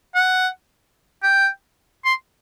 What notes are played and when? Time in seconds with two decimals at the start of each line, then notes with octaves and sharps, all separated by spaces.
0.15 F#5
1.23 G5
2.05 C6